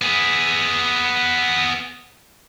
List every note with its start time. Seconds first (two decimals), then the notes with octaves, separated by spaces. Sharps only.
0.02 B3 G#4